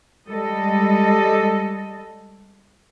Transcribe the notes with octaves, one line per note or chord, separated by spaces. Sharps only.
G3 G#3 A4 D#5